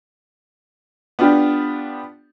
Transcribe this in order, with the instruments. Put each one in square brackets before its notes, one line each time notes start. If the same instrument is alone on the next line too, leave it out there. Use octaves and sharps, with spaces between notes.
[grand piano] B3 D4 F4 G4